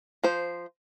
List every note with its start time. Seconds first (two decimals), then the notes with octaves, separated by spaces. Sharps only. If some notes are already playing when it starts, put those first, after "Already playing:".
0.23 F3 C5